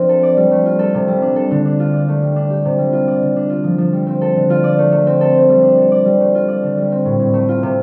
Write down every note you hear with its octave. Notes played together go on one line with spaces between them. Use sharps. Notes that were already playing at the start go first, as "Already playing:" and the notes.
Already playing: F3 C4 D4 F4 C5
A4
D5
G3
A3
F4
A4
C3
G3
D4
A4
D3
D4
F4
D5
A3
G3
D4
G4
C3
G3
F4
D5
D3
D4
F4
F3
F3
G3
C4
A4
D3
F4
D5
A3
A3
C4
A4
C5
G3
D4
A4
D5
G3
A3
F4
D5
D3
G3
C4
A2
A2
A3
F4
C3